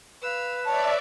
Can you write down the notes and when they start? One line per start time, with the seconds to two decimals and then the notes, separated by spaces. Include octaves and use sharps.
0.22 B4 F5 E6
0.66 C#5 D5 E5 A5